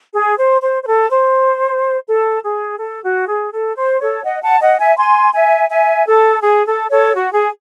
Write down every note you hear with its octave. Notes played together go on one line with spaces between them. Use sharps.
G#4
C5
C5
C5
A4
C5
A4
G#4
A4
F#4
G#4
A4
C5
A4 C#5
D#5 F#5
F#5 A5
D#5 F#5
E5 G#5
G#5 C6
E5 G#5
E5 G#5
A4
G#4
A4
A4 C#5
F#4
G#4